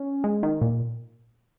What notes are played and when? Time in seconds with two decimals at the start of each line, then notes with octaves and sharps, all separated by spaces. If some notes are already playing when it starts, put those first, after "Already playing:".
Already playing: C#4
0.24 G#3
0.43 D#3
0.61 A#2